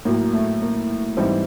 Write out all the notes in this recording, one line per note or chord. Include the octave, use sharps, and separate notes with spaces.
A2 F#3 A#3
A3
A#3
G#2 E3 G3 C4